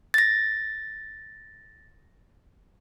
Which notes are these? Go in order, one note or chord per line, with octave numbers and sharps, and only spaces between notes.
A6 A#6